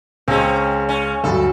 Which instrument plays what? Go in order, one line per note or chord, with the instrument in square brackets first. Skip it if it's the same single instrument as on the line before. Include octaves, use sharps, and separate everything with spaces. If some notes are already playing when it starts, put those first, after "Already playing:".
[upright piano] C#2 G#3 [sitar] C4 C#4
[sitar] C#4
[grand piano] D2 F#3 [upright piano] G2 [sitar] A4